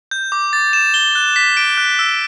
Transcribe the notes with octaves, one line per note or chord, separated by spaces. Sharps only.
G6
D6
A6
E7
G7
F#6
B6
D7
F#6
E6